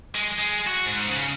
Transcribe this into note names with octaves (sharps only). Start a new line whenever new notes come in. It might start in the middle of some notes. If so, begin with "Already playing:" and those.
G#3
G#3
F#4
G#2
C#3